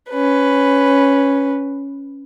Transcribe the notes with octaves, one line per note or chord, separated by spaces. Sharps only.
C#4 B4